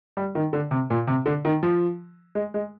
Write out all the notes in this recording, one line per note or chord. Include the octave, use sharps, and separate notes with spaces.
G3
D#3
D3
C3
A#2
C3
D3
D#3
F3
G#3
G#3